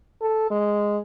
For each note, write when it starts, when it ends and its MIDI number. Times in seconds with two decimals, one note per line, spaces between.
0.21 0.48 69
0.51 0.99 56